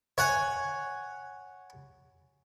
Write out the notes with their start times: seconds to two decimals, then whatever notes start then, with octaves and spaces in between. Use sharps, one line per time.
0.18 C#5 F#5 G#5